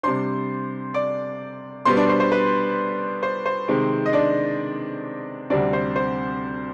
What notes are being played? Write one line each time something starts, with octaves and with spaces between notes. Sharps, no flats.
C3 G3 D4 C5 C6
D5 D6
B2 G3 B3 C5 C6
D4 D5
C5
C5
B4
C5
C5
C3 D#3 G#3 C4
D#5
D4 D5
D2 C3 G3 C4 D4 D5
C5
C5